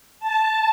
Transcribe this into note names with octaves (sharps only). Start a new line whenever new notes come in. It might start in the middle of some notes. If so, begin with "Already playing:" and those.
A5